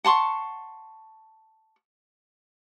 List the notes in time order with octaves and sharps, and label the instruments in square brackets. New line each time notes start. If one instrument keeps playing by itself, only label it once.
[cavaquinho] F#5 A5 C6 C#6